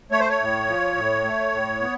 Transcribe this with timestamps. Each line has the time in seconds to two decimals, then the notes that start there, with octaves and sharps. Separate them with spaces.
0.11 A3 C#5
0.20 C5
0.29 C#5
0.39 A2
0.67 F3
0.95 A2
1.24 A3
1.52 A2
1.80 B3